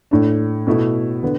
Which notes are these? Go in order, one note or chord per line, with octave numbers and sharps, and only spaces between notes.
A2 A3 D4
B2 A3 E4
D3 B3